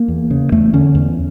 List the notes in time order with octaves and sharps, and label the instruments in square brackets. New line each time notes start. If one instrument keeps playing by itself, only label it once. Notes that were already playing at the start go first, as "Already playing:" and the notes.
Already playing: [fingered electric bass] A#3
E2
C#3
E2 A3
D3 C#4
E2